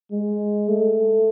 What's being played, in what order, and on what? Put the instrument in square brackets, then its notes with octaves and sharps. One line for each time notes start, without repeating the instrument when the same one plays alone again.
[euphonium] G#3
A3